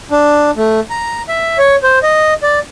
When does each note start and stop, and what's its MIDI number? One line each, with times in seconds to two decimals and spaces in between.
0.11 0.51 62
0.57 0.80 57
0.90 1.22 82
1.28 1.58 76
1.58 1.76 73
1.83 1.99 72
2.03 2.34 75
2.43 2.59 74